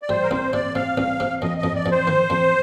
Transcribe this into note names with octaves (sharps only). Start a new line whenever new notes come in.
D5
G3 C5
A#4
C2 C5
C3 D5
C3 F5
C2
C3
F2 D#5
D#5
F2
D5
F2
C5
D#3
F2